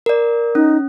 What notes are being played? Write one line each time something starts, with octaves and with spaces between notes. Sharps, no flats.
A#4 D5
C#4 D#4